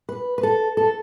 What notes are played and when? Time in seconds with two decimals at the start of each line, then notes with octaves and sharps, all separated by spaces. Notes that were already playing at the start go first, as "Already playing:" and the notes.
0.09 B4
0.38 B4
0.43 A4
0.77 A4